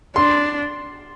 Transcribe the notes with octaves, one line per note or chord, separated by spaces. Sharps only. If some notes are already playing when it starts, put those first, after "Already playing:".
D4 C6